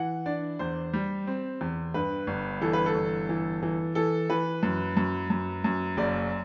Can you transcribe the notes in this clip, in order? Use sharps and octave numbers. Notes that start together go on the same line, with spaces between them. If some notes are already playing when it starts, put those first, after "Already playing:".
Already playing: E3 F#5
D4 D5
E2 C5
G3
C4
E2
G2 B4
G1
E3 A4
B4
A4
G1
E3
E3
E3 A4
E3 B4
F#2
F#2
F#2
F#2
F#1 D5